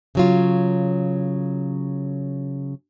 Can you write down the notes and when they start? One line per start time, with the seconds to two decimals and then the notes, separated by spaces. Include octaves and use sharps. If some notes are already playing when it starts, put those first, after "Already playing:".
0.15 C#3 F#3 F4